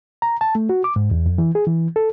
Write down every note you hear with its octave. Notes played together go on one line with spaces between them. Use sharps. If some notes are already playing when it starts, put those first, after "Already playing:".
A#5
A5
A3
F#4
D6
G#2
E2
F2
E3
G#4
E3
A4